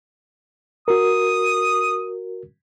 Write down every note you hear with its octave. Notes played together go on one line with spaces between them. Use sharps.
F#4 A#4 D#6